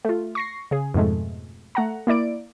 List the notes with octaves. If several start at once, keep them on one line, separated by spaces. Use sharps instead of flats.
A3 F4
C#6 A#6 C7
C#3 G#4
F2 G#2 B2 G#3 A3
A3 F#5 A#5
A#3 E4 D5 D7